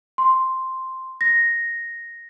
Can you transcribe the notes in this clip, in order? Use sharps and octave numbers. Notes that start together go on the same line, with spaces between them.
C6
A#6